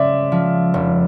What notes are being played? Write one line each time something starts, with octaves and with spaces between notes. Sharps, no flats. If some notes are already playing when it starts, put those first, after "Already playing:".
Already playing: C#3 G#3 D5 E5
F3
F1